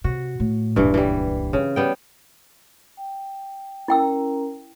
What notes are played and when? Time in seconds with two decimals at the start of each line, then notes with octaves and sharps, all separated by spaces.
0.04 C3 F#4
0.40 A2
0.76 D#1 C#2 G2 E3
0.94 E3 G3
1.53 C#3 C4
1.76 G3 B3 G5
2.97 G5
3.88 C#4 E4 A#4 G5 A#5 E6